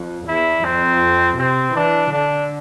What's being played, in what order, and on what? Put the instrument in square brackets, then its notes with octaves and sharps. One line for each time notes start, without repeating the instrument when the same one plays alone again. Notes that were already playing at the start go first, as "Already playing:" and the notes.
Already playing: [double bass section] F2
[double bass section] E2 [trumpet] E4
[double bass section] F2 [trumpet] C4
[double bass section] C3 [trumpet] C4
[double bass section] E3 [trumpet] D4
[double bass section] D3 [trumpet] D4